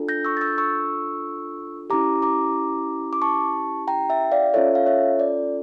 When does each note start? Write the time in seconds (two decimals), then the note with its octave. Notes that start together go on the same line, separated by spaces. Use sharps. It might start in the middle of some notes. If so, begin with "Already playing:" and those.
Already playing: D4 F4 A4
0.09 G6 A#6
0.25 C#6 E6
0.37 A6
0.41 E6 G6
0.58 C#6 E6
1.90 C#4 E4 G4 A#5 D6
2.22 A#5 D6
3.13 D6
3.22 A5 C#6
3.88 G5 A#5
4.10 E5 G5
4.32 D5 F5
4.54 C#4 F4 A4 C#5 E5
4.75 F5
4.86 C#5 E5
5.20 D5